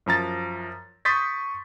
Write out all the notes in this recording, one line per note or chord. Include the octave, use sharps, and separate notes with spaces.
F#2 F3 A#5 A6
C6 C#6 D#6 G6 A6 B6